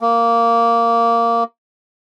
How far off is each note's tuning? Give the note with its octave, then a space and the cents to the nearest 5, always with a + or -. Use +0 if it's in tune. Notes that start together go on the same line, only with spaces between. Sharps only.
A#3 -10